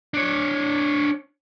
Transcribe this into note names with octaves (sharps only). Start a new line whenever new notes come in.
D4 C#5